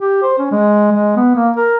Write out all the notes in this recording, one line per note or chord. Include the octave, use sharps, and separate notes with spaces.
G4
C5
C#4
G#3
G#3
B3
A#3
A#4